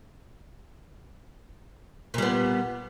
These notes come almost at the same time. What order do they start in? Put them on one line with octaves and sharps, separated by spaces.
A#2 G3 B3